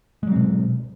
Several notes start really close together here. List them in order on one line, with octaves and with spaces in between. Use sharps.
G#3 F#3 C4 B2